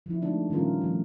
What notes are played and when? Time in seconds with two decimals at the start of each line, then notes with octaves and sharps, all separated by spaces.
0.06 F3 E4
0.22 G#3 A3 D4 D#4
0.50 A#2 D#3 G3 C#4 F4 A#4
0.81 F3 A3